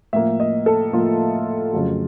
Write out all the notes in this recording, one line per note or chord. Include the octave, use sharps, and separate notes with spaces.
A2 F3 A#3 E5
D#5
A4
A2 F3 A#3 F4
F2 C#3 F#3 A3